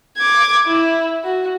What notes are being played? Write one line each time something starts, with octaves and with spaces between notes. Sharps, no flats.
D6 G#6
E4
F#4